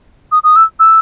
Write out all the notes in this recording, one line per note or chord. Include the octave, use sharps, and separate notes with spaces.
D#6
D#6
E6
E6